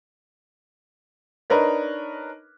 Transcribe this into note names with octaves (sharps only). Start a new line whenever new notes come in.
D4 D#4 A#4 B4 C#5